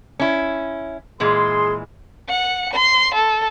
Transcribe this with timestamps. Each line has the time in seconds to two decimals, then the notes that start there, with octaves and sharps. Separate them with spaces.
0.20 C#4 E4
1.20 A#2 E3 G#3 G#4 C6
2.29 F#5 C#7
2.73 C6
3.15 A4